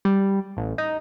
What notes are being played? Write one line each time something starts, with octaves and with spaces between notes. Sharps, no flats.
G3
A1
D#4